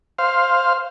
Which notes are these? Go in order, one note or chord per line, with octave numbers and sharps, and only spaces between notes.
C5 F5